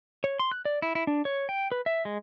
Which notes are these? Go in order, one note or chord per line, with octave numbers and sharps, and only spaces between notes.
C#5
C6
F#6
D5
E4
E4
D4
C#5
G5
B4
E5
G#3